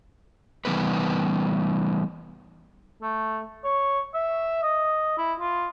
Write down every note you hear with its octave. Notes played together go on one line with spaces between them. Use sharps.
E3 G3 B3 D#4 B4
A3
C#5
E5
D#5
E4
F4